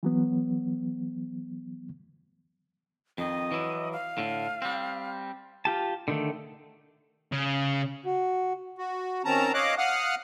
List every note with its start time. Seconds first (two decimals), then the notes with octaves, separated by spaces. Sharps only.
0.03 E3 F#3 B3
3.18 F2 D#3 D#5
3.51 E3 F#3 E4
3.92 F5
4.18 A2 D3
4.62 G3 C4
5.65 F4 G4 A5
6.08 D3 D#3 A3
7.32 C#3
8.06 F#4
8.78 F#4
9.25 D#3 C4 C#4 A5 A#5
9.54 C#5 D#5 F5 D6 F#6
9.78 F5 F#5 D#6 F6 F#6